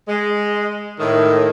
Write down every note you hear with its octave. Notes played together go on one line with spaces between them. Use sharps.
G#3
A2 D#3